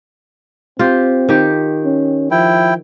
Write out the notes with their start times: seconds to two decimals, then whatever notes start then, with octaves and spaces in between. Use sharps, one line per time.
0.79 C4 F4 G4
1.29 D#3 G4
1.85 C#4
2.31 F3 E4 G5